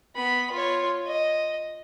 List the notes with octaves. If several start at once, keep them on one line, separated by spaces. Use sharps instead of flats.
B3 B5
F4 C#5
D#5